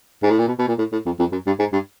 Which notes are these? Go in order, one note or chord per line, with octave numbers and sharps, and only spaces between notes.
G#2
A2
A#2
B2
B2
A#2
A2
A2
F2
F2
F#2
G2
G#2
G2